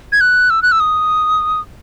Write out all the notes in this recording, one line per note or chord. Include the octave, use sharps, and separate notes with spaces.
G#6
F#6
E6
F#6
E6
D#6